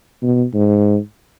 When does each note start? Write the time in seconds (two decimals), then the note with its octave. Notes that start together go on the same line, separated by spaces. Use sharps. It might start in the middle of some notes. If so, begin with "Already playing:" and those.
0.22 B2
0.54 G#2